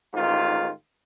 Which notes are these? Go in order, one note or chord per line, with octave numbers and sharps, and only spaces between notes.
A1 G#2 D#3 F4